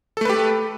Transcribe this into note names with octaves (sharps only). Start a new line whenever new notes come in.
A3 G4 A4 B4